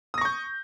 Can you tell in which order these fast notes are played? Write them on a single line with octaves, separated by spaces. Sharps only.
D#6 A#6 C#6 G6